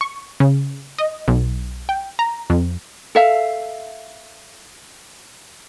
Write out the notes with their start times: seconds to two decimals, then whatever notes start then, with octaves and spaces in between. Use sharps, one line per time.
0.01 C#6
0.40 C#3
0.99 D#5
1.28 B1
1.89 G5
2.19 A#5
2.50 F2
3.15 A4 E5 F5